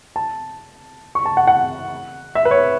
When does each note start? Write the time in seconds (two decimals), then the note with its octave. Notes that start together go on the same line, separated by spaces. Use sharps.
0.16 A5
1.15 C#6
1.26 A5
1.37 F#5
1.47 F#5
2.35 E5
2.45 B4
2.51 C#5